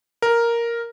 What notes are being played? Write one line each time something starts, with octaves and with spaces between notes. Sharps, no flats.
A#4